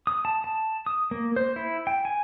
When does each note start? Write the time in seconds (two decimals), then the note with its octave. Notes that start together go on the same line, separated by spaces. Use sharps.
0.07 D#6
0.25 A5
0.44 A5
0.86 D#6
1.11 A#3
1.36 C5
1.56 E4
1.87 G5
2.05 G#5